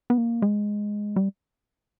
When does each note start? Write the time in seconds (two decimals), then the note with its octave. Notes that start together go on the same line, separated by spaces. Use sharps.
0.10 B3
0.18 A#3
0.42 G#3
1.16 G3